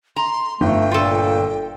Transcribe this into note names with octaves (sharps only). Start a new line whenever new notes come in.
A#5 C6
G1 A3 G5
A#2 F4 A4